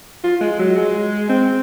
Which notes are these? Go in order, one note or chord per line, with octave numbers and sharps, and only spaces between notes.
F4
G#3
F#3
G#3
C4